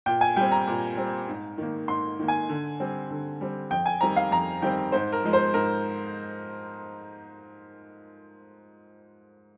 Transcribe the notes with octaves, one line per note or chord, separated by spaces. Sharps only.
A#2 G5
G#5
G3 C4 G5
A#5
A#2
G3 C4
G#2
D#3 A#3
G#2 C6
D#3 A#3
G#5
D3
G3 C4
D3
G3 C4
F2 G5
G#5
D#3 G3 C4 A#5
F5
F2 A#5
D#3 G3 C4 G5
G#2 C5
A#4
F3 G#3
C5
G#2 A#4